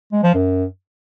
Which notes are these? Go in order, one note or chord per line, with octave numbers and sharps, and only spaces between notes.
G#3
F3
F#2